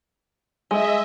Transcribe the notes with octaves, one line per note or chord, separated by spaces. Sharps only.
G#3 D#5 E5